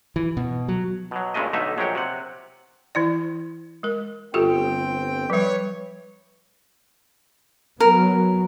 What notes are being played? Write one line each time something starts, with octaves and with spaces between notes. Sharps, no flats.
E3
B2
F#3
B2 F#3
G2 A#2 C#3 G#3 A3 D#5
B1 D3 A3 D#4 E5
A#1 F#3 G#3 G4 C#5 G5
C3 F#5
E3 E4 D5
G#3 A#4
G1 C4 F4 G4 A4 G5
F3 G3 B4 C#5
F#3 B3 A#4